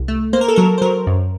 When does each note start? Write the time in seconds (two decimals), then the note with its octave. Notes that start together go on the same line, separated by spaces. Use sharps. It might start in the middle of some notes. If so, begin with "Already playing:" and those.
Already playing: C2
0.08 A3
0.33 A#3 C5
0.41 A#4
0.48 A4
0.56 F#3 A#4
0.78 C5
0.82 F#3 A#4
1.07 F#2